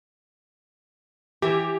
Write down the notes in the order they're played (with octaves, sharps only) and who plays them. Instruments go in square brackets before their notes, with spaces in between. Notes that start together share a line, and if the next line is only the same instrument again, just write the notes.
[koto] E3 E5 [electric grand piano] G4